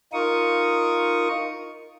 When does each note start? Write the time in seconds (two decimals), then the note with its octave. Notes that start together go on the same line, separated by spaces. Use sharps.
0.13 D#4 F4 A#4 C#6 D#6